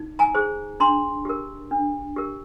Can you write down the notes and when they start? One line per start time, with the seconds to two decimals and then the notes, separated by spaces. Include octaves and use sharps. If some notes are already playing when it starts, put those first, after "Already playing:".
Already playing: D#4
0.19 G#5 A#5
0.34 G#4 C5
0.80 D4 A#5 C6
1.25 G4 A#4
1.71 D4
2.16 G4 A#4